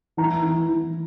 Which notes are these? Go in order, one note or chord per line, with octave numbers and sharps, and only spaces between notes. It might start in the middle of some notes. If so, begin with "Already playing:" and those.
E3 A#5
E3
E3